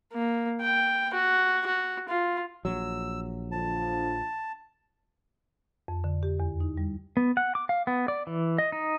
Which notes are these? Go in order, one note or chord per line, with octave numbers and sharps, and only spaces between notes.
A#3
G5
F#4
F#4
F4
A#1 F#3 E6
D3 F3 A5
F2
D3
G4
E2
D#4
G3
B3
F#5
D6
F5
B3
D5
E3
D#5
D#4